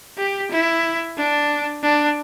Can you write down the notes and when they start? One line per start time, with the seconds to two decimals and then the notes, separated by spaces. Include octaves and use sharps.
0.18 G4
0.51 E4
1.17 D4
1.83 D4